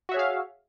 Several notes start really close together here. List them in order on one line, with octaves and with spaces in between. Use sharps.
F#4 E5 C#5 G#4 F5